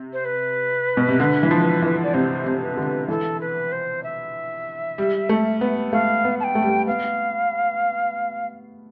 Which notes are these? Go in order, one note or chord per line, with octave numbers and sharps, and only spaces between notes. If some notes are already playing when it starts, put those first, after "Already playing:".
Already playing: C3
C5
B4
B2
C3
D3
E3
F3
E3
D5
C3 C5
C3
B4
D3
E3 A4
B4
C5
E5
G3
A3
B3
A3 F5
B3
A5
G5
A3
G3
A3
B3 F5